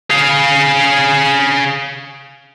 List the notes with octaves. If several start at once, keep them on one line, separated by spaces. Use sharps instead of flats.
G#4 F5